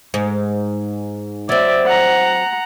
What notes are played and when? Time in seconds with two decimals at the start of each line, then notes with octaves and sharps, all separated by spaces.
0.14 G#2
1.49 F#3 C4 D5 E5
1.86 F#5 A#5